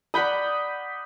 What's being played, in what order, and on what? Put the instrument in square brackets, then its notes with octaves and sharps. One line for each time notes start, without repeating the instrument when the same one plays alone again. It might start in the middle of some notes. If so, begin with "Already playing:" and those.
[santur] D5 F#5 B5 [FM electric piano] D#6 G6 B6